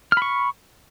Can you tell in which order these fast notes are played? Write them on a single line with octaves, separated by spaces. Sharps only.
F6 B5 C#6